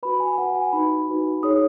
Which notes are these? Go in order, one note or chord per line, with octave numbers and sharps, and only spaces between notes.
F#4 B4 B5
G#5
F#4 B4 F#5
G#5
D#4 F#4 B4 B5
D#4 F#4 B4
D#4 G#4 C#5 D#6